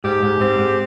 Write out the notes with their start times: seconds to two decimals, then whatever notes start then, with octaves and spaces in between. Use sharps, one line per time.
0.04 G#2 G4
0.23 G#2
0.40 G#2 C4
0.58 G#2